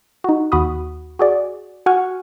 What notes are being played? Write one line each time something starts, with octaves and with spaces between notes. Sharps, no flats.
D#4 F#4
D#2 F#4 B5 D#6
F#4 G#4 D5
F#4 F#5 G#5 C#6 F6